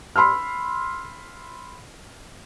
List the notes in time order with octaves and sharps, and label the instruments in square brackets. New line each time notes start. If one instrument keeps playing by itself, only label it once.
[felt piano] B5 C6 E6 F6